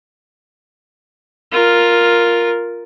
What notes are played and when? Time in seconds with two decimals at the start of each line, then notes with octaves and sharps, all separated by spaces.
1.52 F4 A#4